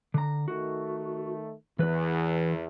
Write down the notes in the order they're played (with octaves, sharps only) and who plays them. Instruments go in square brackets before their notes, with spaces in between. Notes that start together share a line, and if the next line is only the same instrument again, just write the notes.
[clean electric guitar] D3 A#5
[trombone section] D#3 A3 [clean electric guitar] F#4
[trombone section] E2 [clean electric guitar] E3 B4